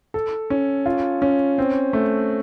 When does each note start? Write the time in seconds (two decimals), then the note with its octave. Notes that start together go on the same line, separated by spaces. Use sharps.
0.14 A4
0.50 C#4
0.86 F4
1.22 C#4
1.58 C4
1.93 A3